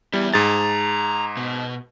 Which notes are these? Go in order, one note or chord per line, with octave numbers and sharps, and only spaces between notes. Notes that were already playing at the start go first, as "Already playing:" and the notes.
G3 B3 E4
G#2 G#4 A5 A#5 A6
B2